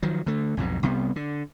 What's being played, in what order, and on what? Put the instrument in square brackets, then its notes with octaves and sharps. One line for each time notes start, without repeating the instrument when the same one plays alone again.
[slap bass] D#3 F3 F#3
D3 A3
B1 F2 G#2 B2
C2 C3 G3 B3
D3